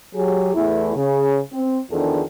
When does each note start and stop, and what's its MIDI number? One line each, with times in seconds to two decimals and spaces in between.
0.15 0.53 54
0.15 0.53 67
0.15 0.53 68
0.55 0.94 40
0.55 0.94 57
0.55 0.94 64
0.95 1.39 49
1.52 1.78 60
1.91 2.21 40
1.91 2.21 51
1.91 2.21 53
1.91 2.21 62
1.91 2.21 68
1.91 2.21 69